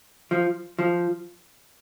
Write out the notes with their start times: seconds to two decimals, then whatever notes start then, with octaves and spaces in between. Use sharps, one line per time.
0.31 F3
0.79 F3